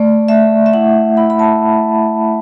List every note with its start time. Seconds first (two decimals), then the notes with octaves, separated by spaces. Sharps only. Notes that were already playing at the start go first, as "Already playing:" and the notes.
Already playing: A3 D5
0.28 A3 E5
0.66 E5
0.74 E4 F#5
1.17 E4 B5
1.30 B5
1.39 A5